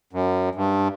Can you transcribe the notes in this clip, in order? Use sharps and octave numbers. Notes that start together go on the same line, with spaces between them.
F#2
G2